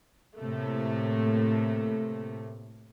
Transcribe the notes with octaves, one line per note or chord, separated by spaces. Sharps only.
A2 C3 A3 A#3